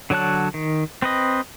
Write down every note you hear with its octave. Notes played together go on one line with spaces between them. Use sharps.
D3 F#3 C#5 A5 F#6
D#3
C4 B4 D#5